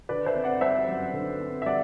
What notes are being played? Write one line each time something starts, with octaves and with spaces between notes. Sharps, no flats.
D3 B4 D5
C5 E5
C4
D5 F#5
G3 C5 E5
F#2
D3
C4
E5
G3 D5 F#5